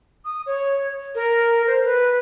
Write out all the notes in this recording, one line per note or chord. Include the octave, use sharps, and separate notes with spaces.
D#6
C#5
A#4
C5
B4